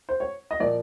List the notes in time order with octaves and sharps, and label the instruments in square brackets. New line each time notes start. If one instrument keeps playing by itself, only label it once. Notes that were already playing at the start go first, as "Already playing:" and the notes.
[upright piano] C5
C#5
D#5
A#2 F3 D5